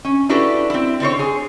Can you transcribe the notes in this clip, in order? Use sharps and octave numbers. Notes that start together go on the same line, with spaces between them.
C#4
D4 E4 F#4 G4 A4 B4
C4 E4
D3 C4 C5 C#5
G#4